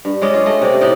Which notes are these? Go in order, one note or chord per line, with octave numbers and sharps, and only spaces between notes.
G2
G#3 C#4 D5 D#5
F4
A3 D#5
C3 D5
A2 D#4 D5 D#5